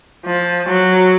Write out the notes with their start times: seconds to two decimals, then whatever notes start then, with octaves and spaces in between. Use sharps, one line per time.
0.25 F3
0.69 F#3